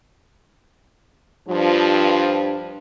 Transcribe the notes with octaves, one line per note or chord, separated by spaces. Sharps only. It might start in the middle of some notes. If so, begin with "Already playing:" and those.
G2 F3